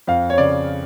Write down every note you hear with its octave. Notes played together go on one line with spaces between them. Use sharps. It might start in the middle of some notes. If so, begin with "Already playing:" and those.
F2 F5
C#5
C#3 D5